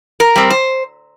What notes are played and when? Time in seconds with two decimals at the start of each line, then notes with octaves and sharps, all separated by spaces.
0.20 A#4
0.36 G3 C4
0.50 C5